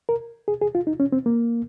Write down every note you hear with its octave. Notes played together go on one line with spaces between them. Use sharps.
A#4
G#4
G#4
F4
D#4
C#4
C4
A#3